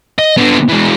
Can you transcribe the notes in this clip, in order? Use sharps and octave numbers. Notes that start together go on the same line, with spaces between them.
D#5
D3 B3
E3 G#3